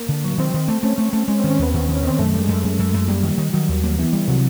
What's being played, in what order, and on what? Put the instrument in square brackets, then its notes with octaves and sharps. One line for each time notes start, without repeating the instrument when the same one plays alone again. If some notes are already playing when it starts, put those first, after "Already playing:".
Already playing: [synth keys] A#3
[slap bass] D3
F#3
[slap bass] D#3 [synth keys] C4
[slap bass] D#3
A3
[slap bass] A3 [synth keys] C#4
[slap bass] A3
[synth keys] C#4
[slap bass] A3
[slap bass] G#3 [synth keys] C#4
[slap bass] D#3 [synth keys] C4
[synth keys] C#4
[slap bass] D#2 [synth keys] B3
[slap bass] D#2 [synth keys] B3
[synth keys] C#4
[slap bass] D#3
[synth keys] C#4
[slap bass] D#3 [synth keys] C4
[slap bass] F#2 [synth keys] A3
[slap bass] G3
[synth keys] G#3
[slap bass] F#2
F#2
F#2
F#2
[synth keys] G3 [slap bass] A#3
[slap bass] D#3
D#3
[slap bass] D#3 [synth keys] F#3
[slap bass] D#2
A#3
[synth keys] E3 [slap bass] B3
[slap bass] G3
[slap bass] C3 [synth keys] F#3